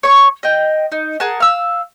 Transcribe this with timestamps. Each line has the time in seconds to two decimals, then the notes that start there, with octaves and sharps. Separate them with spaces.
0.03 C#5 C#6
0.43 D#5 G5
0.92 D#4
1.20 G#4 A#4 F#5 A5
1.40 F5 E6